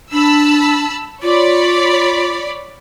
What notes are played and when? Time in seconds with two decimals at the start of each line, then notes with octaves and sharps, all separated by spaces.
0.12 D4 A5 B5 E6
1.22 F4 C#5 D5 B5